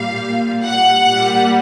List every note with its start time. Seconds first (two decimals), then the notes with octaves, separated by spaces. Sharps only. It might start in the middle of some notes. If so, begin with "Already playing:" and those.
Already playing: A#2 G3 F5
0.64 F#5
1.10 A#2 G3